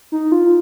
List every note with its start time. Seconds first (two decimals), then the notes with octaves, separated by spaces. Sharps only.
0.12 D#4
0.32 F4